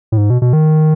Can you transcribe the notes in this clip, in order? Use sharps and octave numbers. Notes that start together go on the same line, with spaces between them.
A2
G#2
B2
B2
D#3